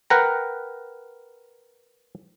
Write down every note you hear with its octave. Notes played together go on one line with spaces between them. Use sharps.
A#4 B4 F#5 G5 A#5